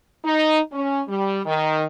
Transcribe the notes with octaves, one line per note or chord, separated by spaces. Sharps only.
D#4
C#4
G3
D#3